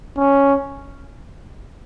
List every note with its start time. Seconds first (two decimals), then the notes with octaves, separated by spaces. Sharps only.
0.18 C#4